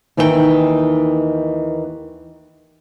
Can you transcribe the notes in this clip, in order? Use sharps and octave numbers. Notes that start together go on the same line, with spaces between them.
D#2 D#3 E3 D#4 C#5 G5